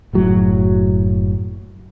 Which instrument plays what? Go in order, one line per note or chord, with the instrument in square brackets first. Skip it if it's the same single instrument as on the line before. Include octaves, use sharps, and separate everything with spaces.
[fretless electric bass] F#1 A2 F#3